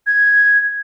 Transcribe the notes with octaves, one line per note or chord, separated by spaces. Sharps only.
G#6